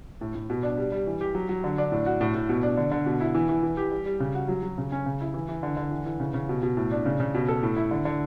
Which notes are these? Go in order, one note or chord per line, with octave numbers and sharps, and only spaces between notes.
A2
A2
B2
D4
G3
G3
E3
G4
F#3
F#3
D3
D4
A2
F#4
A2
A2
B2
D4
D3
D3
B2
E4
E3
E3
E3
G4
G3
G3
C#3
F#4
F#3
F#3
C#3
C#4
C#3
E4
E3
E3
D3
D3
E3
E3
C#3
C#3
B2
B2
A2
D4
C#3
C#3
B2
A4
A2
E4
D3
D3